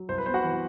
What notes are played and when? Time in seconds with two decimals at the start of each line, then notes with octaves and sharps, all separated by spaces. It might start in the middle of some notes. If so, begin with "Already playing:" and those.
Already playing: F#3
0.09 C2 C5
0.18 B4
0.26 B3 C5
0.34 F#4 F#5
0.43 E3